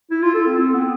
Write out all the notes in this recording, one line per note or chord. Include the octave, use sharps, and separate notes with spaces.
E4
F4
A4
C4
C4
B3